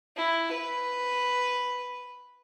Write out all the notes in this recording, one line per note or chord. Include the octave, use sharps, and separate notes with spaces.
E4
B4